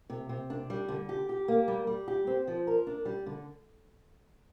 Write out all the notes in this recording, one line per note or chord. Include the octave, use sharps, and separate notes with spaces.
C3
C3
D4
G3
D3
G4
G4
A#3
G3
G3
G4
C4
F3
A#4
D4
G3
D3